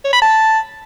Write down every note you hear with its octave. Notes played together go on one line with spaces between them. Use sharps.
C#5
B5
A5